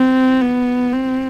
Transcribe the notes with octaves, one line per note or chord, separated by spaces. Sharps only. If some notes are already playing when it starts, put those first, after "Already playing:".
Already playing: C4
B3
C4